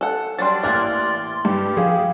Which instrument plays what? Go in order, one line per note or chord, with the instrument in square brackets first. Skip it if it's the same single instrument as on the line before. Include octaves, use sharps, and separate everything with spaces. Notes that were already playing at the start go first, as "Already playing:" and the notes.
[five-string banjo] A4 F#5
[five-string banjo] F#3 G3 D4 [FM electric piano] C6 A6
[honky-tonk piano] A1 F6 F#6 [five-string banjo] A#3 E4 [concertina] D5
[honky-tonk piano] G2 [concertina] G4
[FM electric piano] F3 F5 [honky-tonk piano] G#4